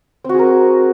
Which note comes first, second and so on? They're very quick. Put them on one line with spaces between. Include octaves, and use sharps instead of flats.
C4 F#4 G#4 A#4